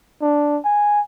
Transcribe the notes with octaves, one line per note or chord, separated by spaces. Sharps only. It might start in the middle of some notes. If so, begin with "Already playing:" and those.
D4
G#5